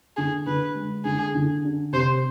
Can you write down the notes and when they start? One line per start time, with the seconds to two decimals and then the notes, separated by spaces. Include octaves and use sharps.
0.17 D3 G#4
0.47 D3 B4
0.75 G#3
1.05 D3 G#4
1.35 D3
1.64 D4
1.93 C3 C5